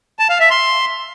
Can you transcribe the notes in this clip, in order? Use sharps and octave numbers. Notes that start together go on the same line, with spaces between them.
A5
F5
E5
C6